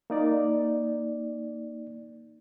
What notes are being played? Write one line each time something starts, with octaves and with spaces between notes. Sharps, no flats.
A#3 D#4 D5